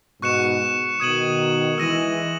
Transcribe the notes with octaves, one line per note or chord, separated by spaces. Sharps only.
G#2 B2 C#6 F#6 C#7 E7
B2 D#3 D#6 G#6 D#7 F#7
E3 G#3 E6 A#6 D#7 F#7